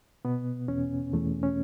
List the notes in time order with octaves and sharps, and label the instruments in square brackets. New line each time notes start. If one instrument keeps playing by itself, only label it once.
[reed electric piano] B2 B3
E2 C#4
E2 A3
C#4